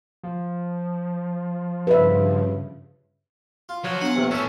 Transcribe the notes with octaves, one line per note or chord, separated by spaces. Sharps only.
F3
G2 C#3 B4 E5
F4
F3 F#3
B3 D4 F5 F#5 G#5
A#1 E2 C3 A3
E3 A3 C#4 A4 E5